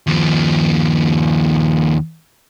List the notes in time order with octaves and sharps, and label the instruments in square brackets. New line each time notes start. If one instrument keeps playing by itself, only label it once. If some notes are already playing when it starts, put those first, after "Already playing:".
[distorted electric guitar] D#2 F3